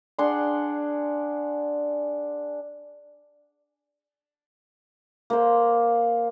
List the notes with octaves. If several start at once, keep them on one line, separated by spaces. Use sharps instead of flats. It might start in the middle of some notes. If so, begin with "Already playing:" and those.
D4 G#4 F#5 C6
A#3 C5